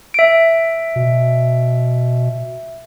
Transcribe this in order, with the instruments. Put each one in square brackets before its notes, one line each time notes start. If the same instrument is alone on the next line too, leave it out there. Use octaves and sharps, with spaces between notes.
[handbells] E5 D7
[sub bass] B2